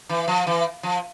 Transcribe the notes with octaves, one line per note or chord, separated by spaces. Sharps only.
E3
F3
E3
F3